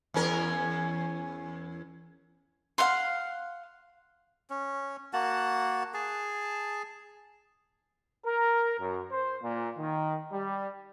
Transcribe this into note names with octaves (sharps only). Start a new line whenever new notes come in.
E2 C#4 A#4
F5 F#5 C6
C#4
A#3 F#4 F#5 A5
G#4 A5
A#4
F#2
C5
A#2
D#3
G3